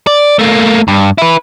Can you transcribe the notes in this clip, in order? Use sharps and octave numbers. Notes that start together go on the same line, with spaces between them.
D5
A3 A#3
G2
E4 B4